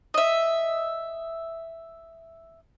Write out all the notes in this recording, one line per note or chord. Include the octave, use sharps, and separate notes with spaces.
D#5 E5